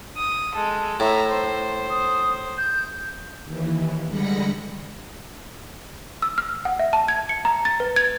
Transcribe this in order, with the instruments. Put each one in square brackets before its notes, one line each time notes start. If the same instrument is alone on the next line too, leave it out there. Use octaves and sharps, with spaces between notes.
[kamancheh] D#6
G#3 A4
[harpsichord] A2 [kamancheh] E5 A#5
[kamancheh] C5
[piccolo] D#6
G6
[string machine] D#2 E3
D3 G3 G#3 B5 A#6 C#7
[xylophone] E6
F6
F#5
E5
A5
G#6
C#7
A#5
A6
B4
G#6